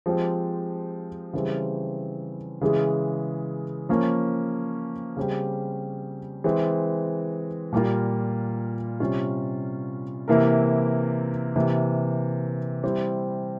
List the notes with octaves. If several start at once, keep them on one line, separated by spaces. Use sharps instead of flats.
F3 G#3 C4 G4
C#3 E3 G3 C4
C#3 E3 G#3
F3 A#3 C#4
C#3 G3 C4 G4
E3 G#3 C4
A#2 G3 A#3 F4
C3 G3 C#4 F4
C3 E3 A#3 E4 A#4
C3 E3 A#3
G3 C4 E4